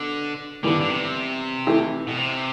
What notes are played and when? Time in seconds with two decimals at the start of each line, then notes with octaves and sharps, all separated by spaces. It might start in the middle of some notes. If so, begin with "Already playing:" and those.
Already playing: B2 D3
0.64 G2 D3 E3 G3 B3
0.81 D3
0.89 C3
1.67 E3 A3 E4 G4
2.07 B2
2.17 C3